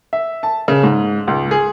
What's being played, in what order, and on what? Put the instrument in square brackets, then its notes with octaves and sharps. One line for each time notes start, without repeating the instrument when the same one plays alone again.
[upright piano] E5
A5
C#3
G#2
C#2
G#4